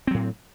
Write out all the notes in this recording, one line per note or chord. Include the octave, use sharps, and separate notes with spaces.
A2 F#3 C4